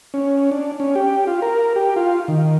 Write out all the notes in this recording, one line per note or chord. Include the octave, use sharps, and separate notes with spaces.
C#4
D4
C#4
G4
F4
A#4
G4
F4
D#3